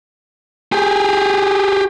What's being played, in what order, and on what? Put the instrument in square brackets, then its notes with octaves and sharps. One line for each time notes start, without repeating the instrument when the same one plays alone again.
[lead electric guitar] G4 G#4